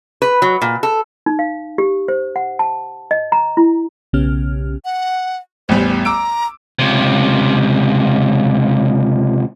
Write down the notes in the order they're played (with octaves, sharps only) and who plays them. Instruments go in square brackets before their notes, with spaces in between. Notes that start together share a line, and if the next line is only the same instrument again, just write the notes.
[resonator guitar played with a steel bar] B4
F#3
A#2
A4
[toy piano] D#4
F5
G4
C5
F#5
A5
D#5
A#5
E4
[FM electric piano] B1 C#3 B3 C#4 G4 F6
[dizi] F#5
[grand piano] A1 E2 G3 [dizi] C5
[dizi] A#5 [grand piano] D6 E6 D7
[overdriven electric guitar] C#2 C3